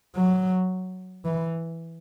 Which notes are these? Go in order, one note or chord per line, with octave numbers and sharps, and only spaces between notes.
F#3
E3